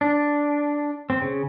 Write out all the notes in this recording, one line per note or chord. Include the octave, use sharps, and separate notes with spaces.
D4
C4
C#3